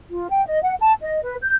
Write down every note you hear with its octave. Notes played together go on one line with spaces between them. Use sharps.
F4
G5
D#5
F#5
A5
D#5
B4
G6